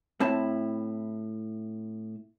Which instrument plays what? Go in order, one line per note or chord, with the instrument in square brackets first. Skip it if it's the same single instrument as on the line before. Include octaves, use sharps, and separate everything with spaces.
[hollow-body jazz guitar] A2 C4 A5 [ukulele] E4